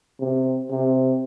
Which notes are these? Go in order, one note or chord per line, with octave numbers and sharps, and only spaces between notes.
C3
C3